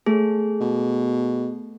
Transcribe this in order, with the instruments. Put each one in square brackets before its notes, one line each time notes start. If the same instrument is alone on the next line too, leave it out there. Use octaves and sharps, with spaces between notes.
[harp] A3 [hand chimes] G#4
[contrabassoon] B2